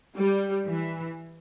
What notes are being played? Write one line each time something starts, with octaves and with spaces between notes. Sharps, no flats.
G3
E3